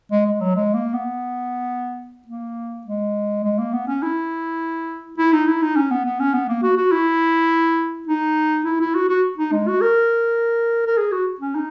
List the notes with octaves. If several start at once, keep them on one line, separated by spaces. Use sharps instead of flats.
G#3
G#3
F#3
G#3
A#3
B3
A#3
G#3
G#3
A#3
B3
C#4
E4
E4
D#4
E4
D#4
C#4
B3
B3
C#4
B3
A#3
F#4
F#4
E4
D#4
E4
E4
F#4
F#4
D#4
G#3
F#4
A#4
A#4
G#4
F#4
C#4
D#4